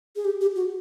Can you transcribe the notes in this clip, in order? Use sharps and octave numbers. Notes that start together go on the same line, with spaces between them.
G#4
G4
G4
F#4